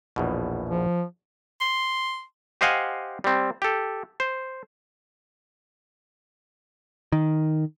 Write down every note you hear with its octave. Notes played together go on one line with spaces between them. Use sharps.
A#1 E2 B2
F3
C6
G4 C5 D#5 F5 F#5 G#5
G3 C4
G4 A4
C5
D#3